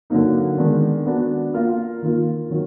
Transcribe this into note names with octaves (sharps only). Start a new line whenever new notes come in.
D3 F#3 A#3 D#4
D#3 G#3 B3 D4
B3 D4 F#4
A#3 F4 A#4 F5
D#3 A#3 F4
D#3 F#3